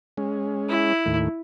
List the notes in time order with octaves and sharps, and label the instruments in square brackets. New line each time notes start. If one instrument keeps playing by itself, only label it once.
[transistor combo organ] G#3 C#4
[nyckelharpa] E4
[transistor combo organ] D#2 A2